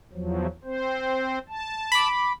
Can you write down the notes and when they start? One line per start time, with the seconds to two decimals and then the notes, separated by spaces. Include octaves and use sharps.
0.13 E2 F3 F#3
0.64 C4 C5
1.49 A5
1.92 B5 D6